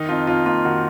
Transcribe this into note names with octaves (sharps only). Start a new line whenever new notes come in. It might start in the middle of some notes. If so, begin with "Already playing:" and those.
Already playing: D#3 D#4
F2 F4
F2 F4
A#3 F4
D#3 F#4